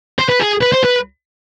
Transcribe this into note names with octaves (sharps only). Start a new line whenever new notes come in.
C5
B4
G#4
B4
C5
B4